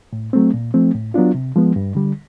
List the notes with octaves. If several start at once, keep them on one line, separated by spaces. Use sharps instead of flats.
A2
F#3 A3 C4
A#2
F3 A3 C4
A2
F#3 B3 D4 F4
C3
F3 G#3 B3
G2
D3 G3